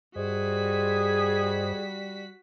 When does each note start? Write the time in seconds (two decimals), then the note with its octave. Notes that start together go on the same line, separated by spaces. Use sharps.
0.16 G2 G3 F#4 G#4 C5 D#5 B6